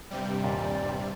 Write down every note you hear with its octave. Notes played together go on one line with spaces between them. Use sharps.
G2 C3 G3 G5
D#2 A#2 D5